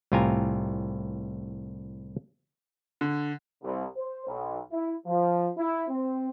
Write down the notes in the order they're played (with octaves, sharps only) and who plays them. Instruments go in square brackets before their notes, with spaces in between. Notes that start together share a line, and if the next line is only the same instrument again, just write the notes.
[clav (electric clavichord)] C2 A2 F4 G4 G#5 A#5
[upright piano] D3
[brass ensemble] C2
C5
B1
E4
F3
E4
C4